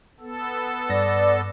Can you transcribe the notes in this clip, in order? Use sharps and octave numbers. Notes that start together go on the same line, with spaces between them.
B3 A4
G2 D5 A#6